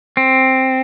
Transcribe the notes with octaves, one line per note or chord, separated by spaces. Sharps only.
C4